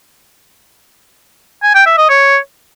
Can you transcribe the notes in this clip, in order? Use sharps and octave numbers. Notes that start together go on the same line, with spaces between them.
G#5
G5
E5
D#5
C#5